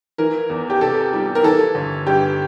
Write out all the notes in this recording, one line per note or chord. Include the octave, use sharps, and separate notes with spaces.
E3 A#4
E2
G4
C3 A4
G3
A#4
E3 A4
G1
G2 G4